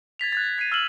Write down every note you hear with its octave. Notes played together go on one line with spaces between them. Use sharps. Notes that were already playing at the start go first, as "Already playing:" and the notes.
G#6 A6 B6 F7
F#6 G#6 A6
G#6 B6 C7 D#7
E6 F6 A6 E7 F#7